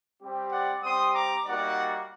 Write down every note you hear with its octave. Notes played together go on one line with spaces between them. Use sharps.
G3 C4 G4
D5 F#5
G3 C4 G4 C6 D#6
A#5 D6
G3 A#3 D#4 F#4 D5 F#5